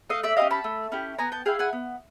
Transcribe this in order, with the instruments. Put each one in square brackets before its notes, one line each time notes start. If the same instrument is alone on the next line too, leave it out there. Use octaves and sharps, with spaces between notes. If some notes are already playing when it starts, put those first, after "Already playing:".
[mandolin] A3 D#5 F5
D5 E5
C#4 E4 G4 D#5 F5
A5 B5
A3
C#4 E4 G4
B3 G#5 A#5
G5 A5
E4 G#4 F5 G5
F#5 G#5
B3